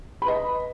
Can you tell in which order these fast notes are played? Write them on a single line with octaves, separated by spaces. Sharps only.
B5 B4 D#5